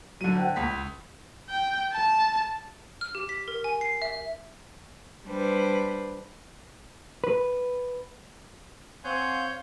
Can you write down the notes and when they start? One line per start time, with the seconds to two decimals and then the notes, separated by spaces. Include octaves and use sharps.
0.21 D3 F#3 D#7
0.36 F#5 G5 F#6
0.56 C#2 B6
1.49 G5
1.93 A5
3.01 F6
3.15 G4
3.29 B6
3.48 A#4
3.64 G#5
3.81 C7
4.02 E5
5.24 G3 D4 B4 C5
7.24 B4
9.05 C4 C#5 F5 F#5 G#5 C6 G6